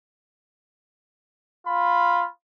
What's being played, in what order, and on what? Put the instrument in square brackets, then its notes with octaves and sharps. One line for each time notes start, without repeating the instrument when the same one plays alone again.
[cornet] F4 [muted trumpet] B5